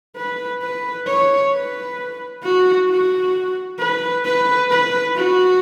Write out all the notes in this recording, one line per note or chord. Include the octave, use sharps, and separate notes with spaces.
B4
B4
C#5
B4
F#4
F#4
B4
B4
B4
F#4